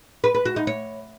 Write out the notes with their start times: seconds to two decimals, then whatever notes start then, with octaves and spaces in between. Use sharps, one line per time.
0.24 B4
0.35 B4
0.45 F#4
0.56 D#4
0.67 C#5